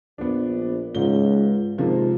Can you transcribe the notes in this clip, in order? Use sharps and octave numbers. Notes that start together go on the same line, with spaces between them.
A#1 B3 D4
C#2 G#2 G7
G#2 C3 F3 A#3